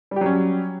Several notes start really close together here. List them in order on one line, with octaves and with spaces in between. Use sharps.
G3 G4 F#3 C#4